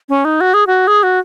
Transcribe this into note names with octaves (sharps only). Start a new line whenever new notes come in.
C#4
D#4
F#4
G#4
F#4
G#4
F#4